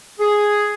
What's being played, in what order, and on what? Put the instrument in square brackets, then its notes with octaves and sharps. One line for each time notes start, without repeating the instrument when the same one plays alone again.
[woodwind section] G#4